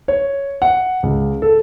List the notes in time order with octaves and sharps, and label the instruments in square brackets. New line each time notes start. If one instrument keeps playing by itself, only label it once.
[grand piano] C#5
F#5
C#2
A4